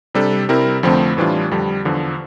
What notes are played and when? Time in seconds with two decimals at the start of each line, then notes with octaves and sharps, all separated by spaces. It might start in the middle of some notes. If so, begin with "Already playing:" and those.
0.14 C3 G3 D4 A4
0.49 C3 G3 C4 E4 A#4
0.83 F2 D3 F3 A3 C4
1.17 A2 E3 G3 D4 F4
1.51 F2 D3 G3
1.85 E2 D3 F3